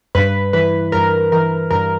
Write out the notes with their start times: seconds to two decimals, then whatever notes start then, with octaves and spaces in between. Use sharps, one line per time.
0.15 G2 B4
0.53 E3 B4
0.92 G2 A#4
1.32 E3 A#4
1.71 G2 A#4